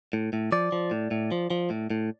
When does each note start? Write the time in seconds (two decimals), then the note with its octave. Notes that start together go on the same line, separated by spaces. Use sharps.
0.13 A2
0.33 A2
0.52 F3 D5
0.72 F3
0.91 A2
1.11 A2
1.32 F3
1.50 F3
1.70 A2
1.90 A2